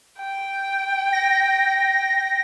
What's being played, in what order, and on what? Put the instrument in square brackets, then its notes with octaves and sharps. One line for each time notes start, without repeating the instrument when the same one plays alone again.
[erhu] G5
[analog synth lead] A#6